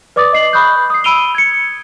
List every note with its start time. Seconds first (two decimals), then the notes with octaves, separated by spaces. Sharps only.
0.16 B4 D5 D6 D#6 A6
0.33 D#5 C7 F#7
0.53 B5 C#6 D#6 F#6 G6
0.90 D#6 C7
1.04 B5 E6 D7 D#7 F7 G7
1.35 G#6 C#7